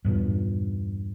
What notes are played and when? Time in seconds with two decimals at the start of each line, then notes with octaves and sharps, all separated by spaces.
0.05 E2 G2 A#2